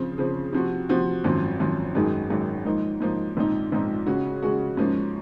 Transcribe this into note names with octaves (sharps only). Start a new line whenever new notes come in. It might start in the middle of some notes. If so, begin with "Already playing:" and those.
Already playing: C#3 F3 C4
C#3 F3 C4
C3 F3 C4 F#4
C3 F3 C4 F#4
G#1 F#2 F3 C4
G#1 F#2 F3 C4
G#1 F#2 D#3 G#3
G#1 F#2 D#3 G#3
G#2 F3 A#3 D#4
G#2 F3 A#3 D#4
A#1 G#2 F3 C4 D#4
A#1 G#2 F3 C4 D#4
C#3 G#3 C#4 F#4
C#3 G#3 C#4 F#4
G#2 F3 A#3 C#4